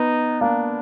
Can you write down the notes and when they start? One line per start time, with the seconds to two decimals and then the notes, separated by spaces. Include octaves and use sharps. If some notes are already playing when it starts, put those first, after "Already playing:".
Already playing: B3 D#4
0.41 A#3 D4